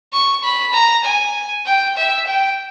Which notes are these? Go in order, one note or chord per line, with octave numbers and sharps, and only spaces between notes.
C#6
B5
A#5
G#5
G5
E5
G5